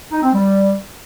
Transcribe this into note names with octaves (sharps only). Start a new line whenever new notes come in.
D#4
C4
G3